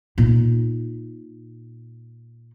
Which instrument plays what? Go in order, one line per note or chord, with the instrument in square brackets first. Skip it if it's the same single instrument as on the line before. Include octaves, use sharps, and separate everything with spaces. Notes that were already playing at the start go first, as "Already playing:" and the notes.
[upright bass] A#2 D#4